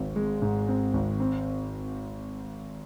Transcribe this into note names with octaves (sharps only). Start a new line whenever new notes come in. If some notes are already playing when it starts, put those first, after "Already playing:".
Already playing: G#1 C4
G#3
G#2
C4
G#1
C4